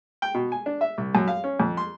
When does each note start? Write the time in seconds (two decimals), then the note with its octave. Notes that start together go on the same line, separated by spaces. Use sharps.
0.22 G5
0.34 B2
0.52 G#5
0.66 D4
0.81 E5
0.98 C2
1.15 F#2
1.28 F5
1.44 C#4
1.60 F2
1.77 C6